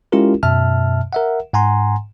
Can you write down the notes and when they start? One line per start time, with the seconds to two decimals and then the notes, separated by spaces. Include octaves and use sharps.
0.12 G#3 C#4 E4 F4 G4 A#4
0.43 F#2 B2 E5 A5 F6
1.13 A#4 E5 F#5
1.53 G#2 F#5 G#5 A#5 C6